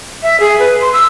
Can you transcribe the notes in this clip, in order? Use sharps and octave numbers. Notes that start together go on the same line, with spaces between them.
E5
G#4
B4
C6
E6